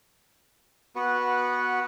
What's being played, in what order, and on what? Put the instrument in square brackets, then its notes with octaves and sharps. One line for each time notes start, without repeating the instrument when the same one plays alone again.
[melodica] B3 F#4 B4 F#5